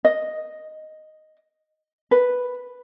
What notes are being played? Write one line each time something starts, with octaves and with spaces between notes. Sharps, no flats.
D#5
B4